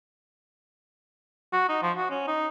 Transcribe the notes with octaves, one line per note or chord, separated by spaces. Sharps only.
F#4
D#4
F3
F#4
C#4
D#4